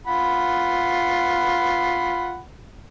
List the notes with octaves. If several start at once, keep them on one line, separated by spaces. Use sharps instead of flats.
F4 F#5 B5